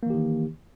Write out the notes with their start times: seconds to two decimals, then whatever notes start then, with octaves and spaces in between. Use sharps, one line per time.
0.03 A#3
0.06 E3
0.10 G4
0.14 D#3